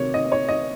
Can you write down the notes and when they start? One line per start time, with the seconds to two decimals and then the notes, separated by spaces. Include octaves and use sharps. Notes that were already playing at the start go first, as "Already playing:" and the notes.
Already playing: C3 D#3 F#3 C#5
0.14 D#5
0.32 C#5
0.48 D#5